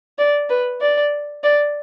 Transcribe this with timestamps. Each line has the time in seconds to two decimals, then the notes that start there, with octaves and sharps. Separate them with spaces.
0.18 D5
0.50 B4
0.81 D5
1.44 D5